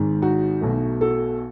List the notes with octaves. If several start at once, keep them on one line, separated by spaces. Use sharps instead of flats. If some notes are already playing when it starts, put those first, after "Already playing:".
Already playing: G#1 G#2 D#3 G#3
D#4 F#4
B1 B2 A3
F#4 A4